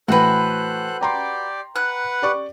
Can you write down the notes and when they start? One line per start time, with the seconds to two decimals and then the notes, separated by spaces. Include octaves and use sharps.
0.08 A2 E3 F#4 A4 B4 C5 G5 F#6
1.01 G4 D5 G5 A#5 C6
1.76 B4 F#5 F#6
2.22 G4 D5 C#6